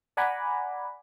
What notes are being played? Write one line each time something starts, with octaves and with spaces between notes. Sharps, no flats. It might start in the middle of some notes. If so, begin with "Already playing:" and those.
D5 F#5 G#5 A#5 B5 D6